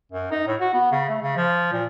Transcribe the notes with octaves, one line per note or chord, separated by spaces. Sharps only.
F#2
D#4
A2
F#4
B3
C#3
A3
C#3
F3
A#2